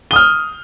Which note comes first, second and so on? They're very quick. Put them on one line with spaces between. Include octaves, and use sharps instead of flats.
G7 D#6 F6